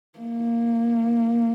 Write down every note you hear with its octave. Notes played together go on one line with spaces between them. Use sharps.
A#3